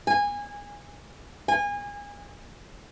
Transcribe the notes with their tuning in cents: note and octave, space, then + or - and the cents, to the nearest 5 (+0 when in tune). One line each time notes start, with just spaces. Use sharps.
G#5 -25
G#5 -30